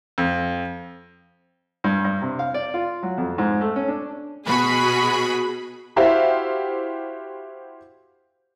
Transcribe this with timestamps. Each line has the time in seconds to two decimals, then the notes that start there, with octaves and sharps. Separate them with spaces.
0.18 F2
1.84 G2
2.05 G2
2.22 C3
2.39 F5
2.54 D5
2.74 F4
3.03 F#3
3.18 F2
3.38 G#2
3.61 A3
3.76 C#4
3.88 D4
4.46 B2 F#4 G#4 B5
5.96 E4 F#4 G4 C5 E5 F5